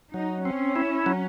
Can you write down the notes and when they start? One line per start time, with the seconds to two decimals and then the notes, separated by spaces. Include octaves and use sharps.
0.14 F#3 D#4
0.44 C4 C#4
0.76 E4
1.06 F#3